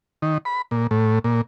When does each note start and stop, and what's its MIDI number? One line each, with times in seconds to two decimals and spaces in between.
0.22 0.38 51
0.45 0.62 83
0.71 0.87 46
0.91 1.19 45
1.24 1.41 46